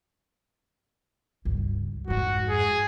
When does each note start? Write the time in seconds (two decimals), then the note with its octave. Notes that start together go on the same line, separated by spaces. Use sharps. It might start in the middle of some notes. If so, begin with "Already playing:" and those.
1.45 C#2 G2
2.08 F2 G#2 F#4
2.49 G#4